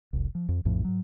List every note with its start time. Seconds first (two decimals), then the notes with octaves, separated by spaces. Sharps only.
0.13 F1 C2
0.35 F3
0.49 F2
0.65 A#1 F2 A2 F3
0.85 G#2 F#3